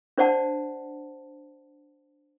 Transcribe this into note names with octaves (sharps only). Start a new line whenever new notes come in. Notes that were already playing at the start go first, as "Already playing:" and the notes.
D4 C5 D5 F#5 A5